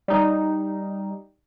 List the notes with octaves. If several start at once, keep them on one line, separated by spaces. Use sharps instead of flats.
G3 D#4